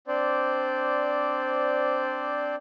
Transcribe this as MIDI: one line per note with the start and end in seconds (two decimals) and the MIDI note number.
0.08 2.55 60
0.08 2.55 62
0.08 2.55 72
0.08 2.55 74